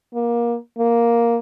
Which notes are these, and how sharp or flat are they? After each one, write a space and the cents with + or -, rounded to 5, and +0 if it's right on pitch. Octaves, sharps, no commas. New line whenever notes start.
A#3 +20
A#3 +5